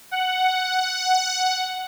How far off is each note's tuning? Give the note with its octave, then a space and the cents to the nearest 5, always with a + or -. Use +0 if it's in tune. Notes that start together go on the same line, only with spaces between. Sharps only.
F#5 +5